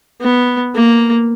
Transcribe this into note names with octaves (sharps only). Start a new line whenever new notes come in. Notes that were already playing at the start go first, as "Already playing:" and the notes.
B3
A#3